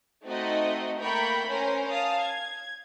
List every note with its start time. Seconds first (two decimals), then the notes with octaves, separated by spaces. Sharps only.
0.24 A3 C4 D#4 F#4 D#5
0.98 A3 A#3 A#4 G5 B5 C#6
1.47 C#4 A#4 C5
1.90 F5 A5 D#6
2.22 G#6